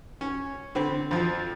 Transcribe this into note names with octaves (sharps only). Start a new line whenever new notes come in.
C#4
D3 C4 B5
F2 F3